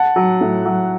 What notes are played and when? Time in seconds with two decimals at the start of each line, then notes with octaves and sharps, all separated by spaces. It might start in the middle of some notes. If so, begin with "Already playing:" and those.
Already playing: F#5 A5
0.16 F#3
0.41 A2
0.66 F#3